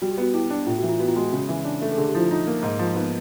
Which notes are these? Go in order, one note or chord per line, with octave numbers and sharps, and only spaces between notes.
G3 F#4
G4
B3 F#4
E4 G4
D4
A2 F4
F#4
E3
F4
B3 F#4
F4
G#3 F#4
C#3
E3
D4
A3
A4
D3 G#4
G4
F3 E4
F4
D#4
A#3
G#2
F3
B3 D#4